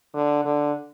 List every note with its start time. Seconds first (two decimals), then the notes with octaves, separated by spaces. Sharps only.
0.14 D3
0.45 D3